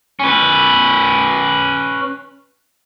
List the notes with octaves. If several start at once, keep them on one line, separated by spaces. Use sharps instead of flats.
C#4 B4